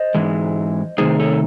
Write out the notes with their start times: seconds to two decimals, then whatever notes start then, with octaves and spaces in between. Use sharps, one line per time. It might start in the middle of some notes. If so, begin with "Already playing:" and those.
Already playing: C5 D#5
0.15 G#2 E3 G#3
0.98 C3 D#3 A3 D#4 G#4 C5
1.20 A4 C#5